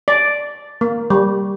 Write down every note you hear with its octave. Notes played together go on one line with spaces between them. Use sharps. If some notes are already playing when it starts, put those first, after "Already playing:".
D5
A#3
G3